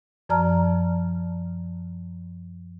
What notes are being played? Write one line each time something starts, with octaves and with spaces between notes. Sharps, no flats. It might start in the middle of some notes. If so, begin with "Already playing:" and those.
F#2 F3 D5 A5 A#5 F6